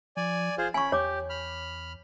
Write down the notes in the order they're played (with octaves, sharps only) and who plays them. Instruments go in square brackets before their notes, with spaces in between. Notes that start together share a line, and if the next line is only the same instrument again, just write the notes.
[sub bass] F3 [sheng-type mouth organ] D5 G#5
[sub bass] F1 [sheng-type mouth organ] F4 G#4 C5
[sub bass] D1 [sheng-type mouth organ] C#4 B5 [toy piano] G#5 C#6
[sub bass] E2 [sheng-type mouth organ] G4 [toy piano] C#5 D6
[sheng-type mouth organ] B5 F6